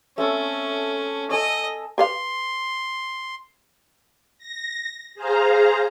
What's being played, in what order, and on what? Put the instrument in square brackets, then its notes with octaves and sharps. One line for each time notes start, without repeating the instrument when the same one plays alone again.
[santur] A3 C4 A4 [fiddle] C#4
[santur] A4 G#5 E6 [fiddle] D#5
[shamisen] G4 B4 F5 [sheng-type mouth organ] C6
[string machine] A#6
G#4 C5 F5 A#5